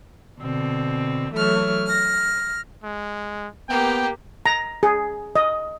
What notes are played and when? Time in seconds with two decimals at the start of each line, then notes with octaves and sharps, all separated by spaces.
0.41 B2 D3 C4
1.34 E3 F#3 A3 C#5 F6
1.87 F6 A#6
2.84 G#3
3.69 A#3 B3 G4 G5
4.46 A#5
4.83 G#4
5.36 D#5